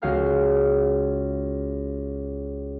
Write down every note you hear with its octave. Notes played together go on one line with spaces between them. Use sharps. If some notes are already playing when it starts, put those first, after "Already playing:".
C#2 F#4 G#4 F5 F6 G6